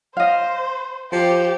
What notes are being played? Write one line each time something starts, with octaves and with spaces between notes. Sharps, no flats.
C5 D#5 F5
F3 G4